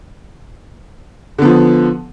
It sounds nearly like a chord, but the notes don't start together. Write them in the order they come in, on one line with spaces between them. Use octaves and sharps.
D3 B3 F3